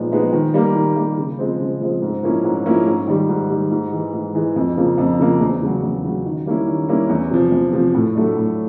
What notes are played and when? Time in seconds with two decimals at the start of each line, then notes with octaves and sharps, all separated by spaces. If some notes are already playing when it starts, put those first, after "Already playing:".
Already playing: A#2 F3 G#3 B3 D#4
0.12 F3 G#3 B3 D#4
0.33 D#3
0.54 G3 A#3
0.75 D#3
0.96 G3 A#3
1.18 C#3
1.39 F3 G#3 C4
1.60 C#3
1.81 F3 G#3 C4
2.02 G#2
2.23 F3 A#3 C#4 E4
2.44 G#2
2.65 F3 A#3 C#4 E4
2.87 G#2
3.07 D#3 G3
3.29 G#2
3.50 D#3 G3
3.71 G#2
3.92 E3 G#3
4.14 G#2
4.35 E3 G#3
4.56 F2
4.77 C#3 F3 A#3
4.98 F2
5.19 C#3 F3 A#3
5.40 E2
5.62 C#3 F#3
5.83 E2
6.04 C#3 F#3
6.25 D#3
6.46 G3 A#3 C#4 E4
6.67 D#3
6.89 G3 A#3 C#4 E4
7.10 E2
7.31 C3 F3
7.52 E2
7.73 C3 F3
7.94 A2
8.15 F#3 A3 D4
8.37 A2